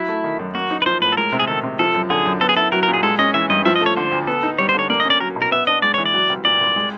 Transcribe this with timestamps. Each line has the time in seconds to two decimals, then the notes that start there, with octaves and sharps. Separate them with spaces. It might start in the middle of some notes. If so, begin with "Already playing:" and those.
Already playing: F#3 E4
0.08 A3
0.24 D#3
0.39 F#2
0.54 A#3 F#4
0.71 D#4
0.82 B4
0.86 F3 C5
1.01 A2 B4
1.12 A4
1.17 G#3 A#4
1.32 C3
1.39 G#4
1.47 D#3 A4
1.63 C3
1.79 F3 A4
1.94 F#2
2.10 D3 G#4
2.26 F#2
2.41 B3 A4
2.49 G#4
2.56 E4 A4
2.72 F#3 A#4
2.83 A#4
2.88 A#2
2.94 G#4
3.03 G#3 A4
3.19 C#4 D#5
3.34 E3 E5
3.50 G2 D#5
3.65 F3 E5
3.76 D#5
3.81 A3
3.86 C#5
3.97 D3 C5
4.12 D2
4.27 B3 A4
4.43 D#4
4.58 G3 C#5
4.69 C5
4.74 D3 C#5
4.90 A#3 D5
5.00 D#5
5.05 C#4 D5
5.20 F#3 A#4
5.36 B2
5.42 A#4
5.51 B3 E5
5.67 D4 D#5
5.82 G#3 D5
5.94 E3 C#5
6.05 D5
6.14 F#3
6.29 C2
6.45 A#2 D5
6.60 C2
6.76 G#3